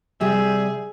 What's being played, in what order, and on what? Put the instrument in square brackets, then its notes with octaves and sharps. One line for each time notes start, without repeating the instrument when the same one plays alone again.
[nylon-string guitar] C3 G3 [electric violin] G#4 [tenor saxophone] E5